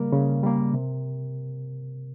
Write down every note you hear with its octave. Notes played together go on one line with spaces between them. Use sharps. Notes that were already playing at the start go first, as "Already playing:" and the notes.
Already playing: C#3 G3 A#3 A#4
C#3
G3 A#3
C3